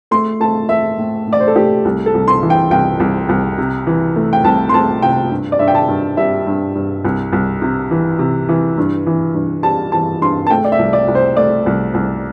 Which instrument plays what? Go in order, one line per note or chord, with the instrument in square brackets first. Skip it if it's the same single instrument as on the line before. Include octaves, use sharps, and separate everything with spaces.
[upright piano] A3 C6
A3 A5
A3 E5
A2
A2
D5
C5
A4
A3 G4
C2
A4
C2
C6
E3
G5
C2 G5
C2
C2
C3
E3
A3
G5
C2 A5
C6
A3 A5
C3 G5
G2
D5
G2 E5
G5
A5
G2
G3 E5
G2
G2
C2
C2
C3
E3
C3
E3
G2
E3
G2
G3 A5
E3 A5
G2 C6
A5
A3 G5
D5
E5
C2
D5
C2
C5
A3 D5
C2
C2